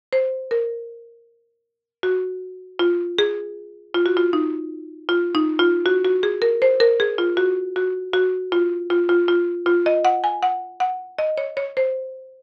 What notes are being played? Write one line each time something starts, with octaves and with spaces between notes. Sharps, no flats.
C5
A#4
F#4
F4
G#4
F4
F#4
F4
D#4
F4
D#4
F4
F#4
F#4
G#4
A#4
C5
A#4
G#4
F4
F#4
F#4
F#4
F4
F4
F4
F4
F4
D#5
F#5
G#5
F#5
F#5
D#5
C#5
C#5
C5